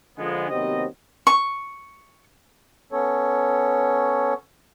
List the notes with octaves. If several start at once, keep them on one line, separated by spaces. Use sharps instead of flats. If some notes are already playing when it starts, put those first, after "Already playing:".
D3 F3 G#3 B3
D#2 C3 F#3 B3 C4 D#5
C#6
B3 C#4 A4 C#5